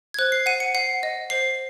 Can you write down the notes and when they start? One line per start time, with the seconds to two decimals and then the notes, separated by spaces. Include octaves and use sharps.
0.14 G#6
0.19 C5 F#6
0.32 C7
0.46 F#5 D#7
0.60 C#7
0.75 F#5 C7
1.03 D#5
1.30 C5 C7